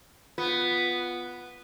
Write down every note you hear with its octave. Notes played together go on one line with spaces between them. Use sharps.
B3 F4